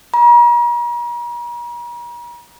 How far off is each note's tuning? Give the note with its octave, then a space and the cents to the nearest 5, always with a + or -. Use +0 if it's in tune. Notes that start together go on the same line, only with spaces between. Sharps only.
A#5 +40